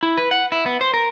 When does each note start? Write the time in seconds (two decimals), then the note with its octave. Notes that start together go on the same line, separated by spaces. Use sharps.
0.03 E4
0.17 B4
0.31 F#5
0.52 E4
0.66 B3
0.81 C5
0.94 A#4